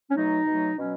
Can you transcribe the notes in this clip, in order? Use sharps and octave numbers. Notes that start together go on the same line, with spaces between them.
C#4
B2 F#3 A3 D#4
B2 F#3 A3
B2 F#3 C#4